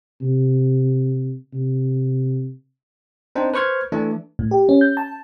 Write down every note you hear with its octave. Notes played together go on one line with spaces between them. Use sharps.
C3
C3
C4 D4 D#4 C5
B4 C5 C#6 F6 G#6
E3 A3 D4
A2
G4
C#4
G6
A5